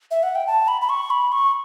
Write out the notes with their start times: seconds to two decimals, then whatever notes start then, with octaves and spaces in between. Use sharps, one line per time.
0.11 E5
0.23 F#5
0.35 G5
0.47 A5
0.68 B5
0.81 B5
0.89 C#6
1.10 B5
1.32 C#6